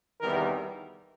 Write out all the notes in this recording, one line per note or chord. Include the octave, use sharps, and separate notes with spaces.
E2 C3 D#3 G3 B3 A#4